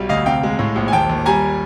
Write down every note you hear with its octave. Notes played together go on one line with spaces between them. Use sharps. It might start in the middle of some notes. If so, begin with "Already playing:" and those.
Already playing: B1 G3
D2 D#5 F5
C3 F5 G5
G#3
A2
A#1
G#5
D#2 G5 A5
D#2
G3 G#5 A#5